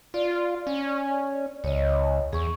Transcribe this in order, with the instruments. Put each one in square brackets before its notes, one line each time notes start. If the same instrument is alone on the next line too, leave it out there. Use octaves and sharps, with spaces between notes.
[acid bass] F4 [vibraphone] D5
[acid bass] C#4
[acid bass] C#2 [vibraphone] C#5 D#5
[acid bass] E2 [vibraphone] G#4 C#6